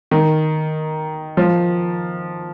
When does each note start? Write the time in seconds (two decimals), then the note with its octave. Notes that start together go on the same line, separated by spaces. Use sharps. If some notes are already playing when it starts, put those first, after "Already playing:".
0.11 D#3
1.37 F3